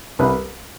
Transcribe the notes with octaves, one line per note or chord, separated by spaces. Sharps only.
C2 B4